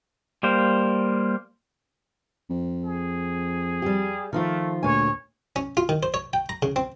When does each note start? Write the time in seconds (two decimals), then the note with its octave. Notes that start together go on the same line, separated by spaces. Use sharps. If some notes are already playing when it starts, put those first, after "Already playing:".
0.43 G3 A#3 C5
2.50 F2
2.84 G#4
3.82 G3 G4
4.33 D#3 F3 A3 F4
4.83 D2 A#2 C#5 G#5
5.56 C#4
5.77 F4
5.89 D#3
6.03 C5
6.14 C#5
6.33 G5
6.49 A#5
6.63 C#3
6.76 C4